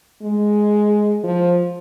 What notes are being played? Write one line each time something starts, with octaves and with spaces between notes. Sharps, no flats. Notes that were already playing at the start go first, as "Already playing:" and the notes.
G#3
F3